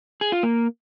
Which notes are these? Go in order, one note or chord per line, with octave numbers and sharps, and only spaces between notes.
G#4
F4
A#3